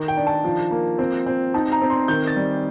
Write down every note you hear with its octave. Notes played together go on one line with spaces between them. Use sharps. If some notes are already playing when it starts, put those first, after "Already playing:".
Already playing: D#3
G5
D4
A5
F3
A#3
C4
C4
D#4 A5
A#5
C4
C6
D#3 G6
A6
G3